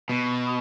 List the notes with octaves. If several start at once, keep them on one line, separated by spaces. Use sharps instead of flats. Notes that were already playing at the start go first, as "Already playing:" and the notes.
B2